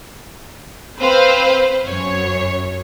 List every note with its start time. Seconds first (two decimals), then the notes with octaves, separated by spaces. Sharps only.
0.98 C4 B4 C5 F5
1.86 F#2 C#5